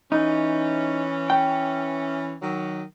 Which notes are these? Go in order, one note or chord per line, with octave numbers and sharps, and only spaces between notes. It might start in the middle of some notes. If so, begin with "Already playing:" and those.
E3 C#4 D#4
G5
D#3 F#3